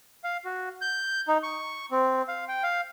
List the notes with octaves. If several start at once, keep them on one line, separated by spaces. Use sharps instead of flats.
F5
F#4
G6
D#4
C#6
C4
F5
G5
F5